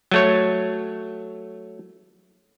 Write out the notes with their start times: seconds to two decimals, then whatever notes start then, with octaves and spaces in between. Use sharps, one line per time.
0.11 F#3 A3 C#5